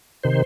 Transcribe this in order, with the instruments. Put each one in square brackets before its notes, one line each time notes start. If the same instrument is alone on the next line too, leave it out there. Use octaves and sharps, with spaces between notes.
[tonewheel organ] C3 D#3 C5